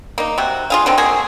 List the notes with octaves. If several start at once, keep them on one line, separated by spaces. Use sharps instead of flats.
A#3 D#4
C3 F#4
F4 G#4 F5
D3 D#3 C4
A#3 F#4 G#4